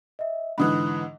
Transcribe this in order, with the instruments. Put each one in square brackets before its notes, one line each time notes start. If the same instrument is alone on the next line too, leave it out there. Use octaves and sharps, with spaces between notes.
[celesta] D#5 E5
[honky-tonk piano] G#2 D3 E3 [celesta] B5 D#6 F#6